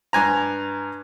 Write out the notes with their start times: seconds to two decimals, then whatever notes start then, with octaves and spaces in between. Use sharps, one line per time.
0.13 G2 G#5 A#5